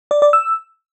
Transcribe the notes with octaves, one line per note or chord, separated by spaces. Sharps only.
D5
D5
E6